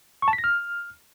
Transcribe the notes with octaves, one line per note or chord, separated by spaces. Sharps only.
C#6
A5
B6
A#6
F6